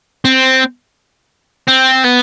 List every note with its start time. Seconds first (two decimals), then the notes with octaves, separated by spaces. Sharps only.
0.25 C4
1.68 C4
2.05 B3